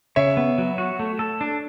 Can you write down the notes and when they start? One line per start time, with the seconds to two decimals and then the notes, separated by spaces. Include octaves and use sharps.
0.16 C#3 C#5 E5
0.37 B3
0.58 F#3
0.78 F#4
1.00 A3
1.19 A4
1.41 D4